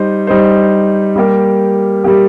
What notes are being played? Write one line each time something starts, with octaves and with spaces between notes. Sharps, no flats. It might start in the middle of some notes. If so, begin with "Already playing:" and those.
Already playing: G3 D#4 C5
G3 D#4 C5
G3 A#3 G4
G3 A#3 G4